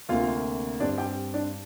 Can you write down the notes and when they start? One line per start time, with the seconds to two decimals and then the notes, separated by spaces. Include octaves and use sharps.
0.09 D2 C3 A#3 F4 F5
0.80 G2 G3 C4 D4 D5
0.98 G4 G5
1.34 D4 D5